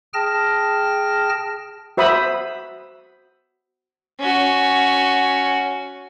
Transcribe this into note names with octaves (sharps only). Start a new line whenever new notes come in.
G#4 G5 A5 F6 A#6
F#4 C5 E5 B5 D#6
C#4 F#4